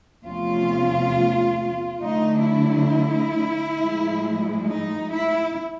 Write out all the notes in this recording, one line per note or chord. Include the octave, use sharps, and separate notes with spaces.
E2 C3 F3 A3 C#4 F4
D3 F#3 A3 D4 D#4
E4
A2 F3 G#3
D#4
E4